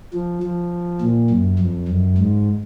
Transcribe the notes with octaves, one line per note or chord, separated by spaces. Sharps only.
F3
F3
A#2
F#2
F2
F#2
G#2